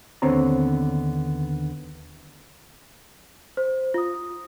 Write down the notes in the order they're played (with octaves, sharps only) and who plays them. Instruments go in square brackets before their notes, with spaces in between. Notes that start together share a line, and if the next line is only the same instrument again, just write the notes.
[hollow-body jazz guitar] D#2 D3 B3 C4 C#5 A#5
[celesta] C5
F4 D#6